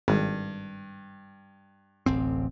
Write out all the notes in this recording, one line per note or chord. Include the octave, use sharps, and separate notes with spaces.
G#1 G2
D1 A1 C4